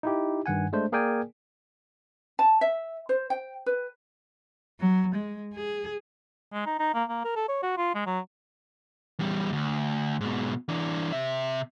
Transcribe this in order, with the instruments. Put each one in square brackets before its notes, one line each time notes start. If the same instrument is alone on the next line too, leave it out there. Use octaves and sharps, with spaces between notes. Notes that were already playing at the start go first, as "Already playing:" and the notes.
[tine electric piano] D#4 E4 G4
G2 D#3 F#5 G#5
G#3 A3 D4 C5
A#3 G#4 A#4 D5 G5 G#5
[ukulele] A5
E5
C5
G5
B4
[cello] F#3
G#3
G#4
[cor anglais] G#3
D#4
D#4
A#3
A#3
A#4
A4
C#5
F#4
F4
G#3
F#3
[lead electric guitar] E2 G3
D2
G#2 B2
E3 D4
C3 E5